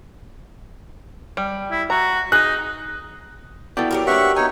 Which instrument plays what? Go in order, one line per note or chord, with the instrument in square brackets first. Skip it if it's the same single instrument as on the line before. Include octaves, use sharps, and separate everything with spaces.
[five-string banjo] G3
[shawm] E4
[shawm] F#4 [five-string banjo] A#5
[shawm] D#4 [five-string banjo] G#4 [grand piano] F#6
[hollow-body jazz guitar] B3 E4 A4 [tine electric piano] F#4 D5 G5
[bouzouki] F#3 G4 A#4
[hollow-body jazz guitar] A#3 D4 B4 [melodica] E5 F#5 C#6
[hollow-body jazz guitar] B3 G#5 [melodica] D#4 C#5